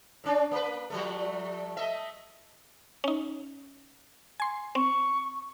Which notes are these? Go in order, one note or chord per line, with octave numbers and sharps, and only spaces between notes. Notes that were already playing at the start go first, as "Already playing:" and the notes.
A2 C#4 D4
A#3 B4
F3 G3 A3
A3 D#5 E5
C#4 D#4
G#5 C6
C4 C#6